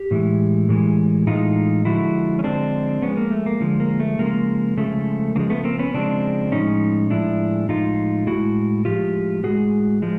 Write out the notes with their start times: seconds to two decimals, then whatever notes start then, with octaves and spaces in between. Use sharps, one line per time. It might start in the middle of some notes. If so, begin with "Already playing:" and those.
Already playing: G4
0.11 A2 E3 G#3
0.69 A2 E3 G#3
1.27 A2 E3 G#3 D#4 F4
1.85 D3 F3 G#3 E4 F#4
2.39 C#4
2.44 D3 F3 G#3 C4 D4
3.02 D3 F3 G#3 B3 C#4
3.17 A#3
3.31 A3
3.46 A#3
3.60 D3 F3 G#3
3.80 A#3
4.00 A3
4.19 C#3 F3 G#3 A#3
4.77 C#3 F3 G#3 A3
5.35 C#3 F3 G#3 A#3
5.50 A3 B3
5.64 A#3 C4
5.79 B3 C#4
5.94 C#3 F3 G#3 C4 D4
6.52 A2 F3 G#3 C#4 D#4
7.10 A2 F3 G#3 D4 E4
7.69 A2 F3 G#3 D#4 F4
8.27 A2 F3 G#3 E4 F#4
8.85 A2 F3 G#3 F4 G4
9.43 A2 F3 G#3 F#4 G#4
10.02 F3 G#3